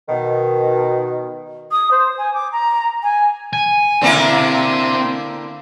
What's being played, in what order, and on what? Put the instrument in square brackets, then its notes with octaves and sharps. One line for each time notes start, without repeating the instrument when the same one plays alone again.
[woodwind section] B2 D#3
[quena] D#6
C5
G#5
D6
A#5
G#5
[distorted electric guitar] G#5
[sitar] D3 A#3 E4 [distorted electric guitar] C4 E5